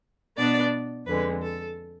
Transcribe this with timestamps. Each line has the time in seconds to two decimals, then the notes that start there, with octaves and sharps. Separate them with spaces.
0.36 B2 B3 D4 D5
1.06 F2 D3 G#3 B4
1.41 A4